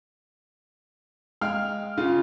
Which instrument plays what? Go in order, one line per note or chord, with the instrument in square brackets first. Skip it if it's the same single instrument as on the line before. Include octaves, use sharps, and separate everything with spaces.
[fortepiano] G#3 F5 G5 [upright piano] F6
[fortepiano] C#3 [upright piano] F4